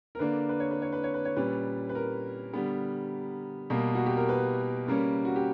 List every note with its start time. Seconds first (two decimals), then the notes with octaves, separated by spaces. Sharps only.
0.15 A#4
0.19 D3 A#3 D4 B4
0.49 B4
0.60 C#5
0.71 B4
0.82 C#5
0.93 B4
1.04 C#5
1.14 B4
1.25 C#5
1.36 A#2 G3 C#4 B4
1.89 B4
1.95 A#4
2.54 D3 G3 B3
3.70 B2 G3 A#3
3.95 F#4
4.06 G4
4.17 A#4
4.29 B4
4.87 C#3 G3 A#3 C#4
5.25 F#4
5.36 G4